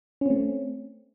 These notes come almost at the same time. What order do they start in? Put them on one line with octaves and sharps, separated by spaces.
C#4 C4 A3